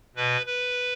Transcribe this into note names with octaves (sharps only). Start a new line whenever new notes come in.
B2 B4
B4